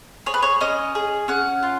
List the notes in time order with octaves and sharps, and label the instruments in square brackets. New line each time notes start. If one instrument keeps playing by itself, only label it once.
[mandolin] G#4 C#5
B4
C#5
C#4 D#5
G#4
C#4 F#5
F4